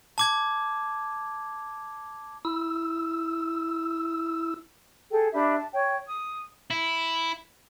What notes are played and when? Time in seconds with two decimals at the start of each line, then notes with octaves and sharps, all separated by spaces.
0.18 A5 D6 G#6
2.45 E4 E6
5.11 G#4 A4 G5
5.33 D4 G4 E5 B5
5.58 A5
5.73 C#5 G5
6.06 D#6
6.70 E4